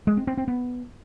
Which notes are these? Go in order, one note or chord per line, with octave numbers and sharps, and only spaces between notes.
G#3
C4
C4
C4
B3